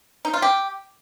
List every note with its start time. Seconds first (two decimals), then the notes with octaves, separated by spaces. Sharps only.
0.25 D#4
0.34 F4
0.42 G4